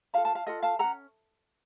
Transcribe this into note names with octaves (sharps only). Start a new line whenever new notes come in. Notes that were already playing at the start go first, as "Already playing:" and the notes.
F4 A4 F5 A5
F5 A5
F5 A5
F4 A4 D#5 F#5
F5 A5
C#4 A4 F#5 A#5